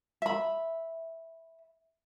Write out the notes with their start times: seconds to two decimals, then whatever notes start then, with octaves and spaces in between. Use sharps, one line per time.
0.22 E5 B5